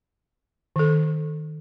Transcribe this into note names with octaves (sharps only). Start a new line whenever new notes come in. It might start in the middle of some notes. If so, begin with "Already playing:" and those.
D#3 A4